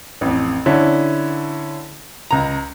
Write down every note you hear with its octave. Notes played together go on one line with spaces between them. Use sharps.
A1 F2
D3 C#4 E4
C#2 A#5